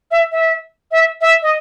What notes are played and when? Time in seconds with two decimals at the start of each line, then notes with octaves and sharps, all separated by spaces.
0.11 E5
0.32 E5
0.91 E5
1.21 E5
1.42 D#5